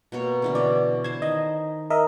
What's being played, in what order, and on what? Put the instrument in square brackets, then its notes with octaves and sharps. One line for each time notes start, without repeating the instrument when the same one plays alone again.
[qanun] B2 A#3 C#5
D3 E3 C#4
[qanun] B2 [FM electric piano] D5
[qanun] C5 A5 [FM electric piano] G#6
[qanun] D#3 [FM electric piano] D#5
[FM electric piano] A#4 D#5 E5